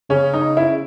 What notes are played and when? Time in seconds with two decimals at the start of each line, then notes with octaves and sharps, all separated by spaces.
0.10 C#3 C#4
0.34 D#4
0.57 E4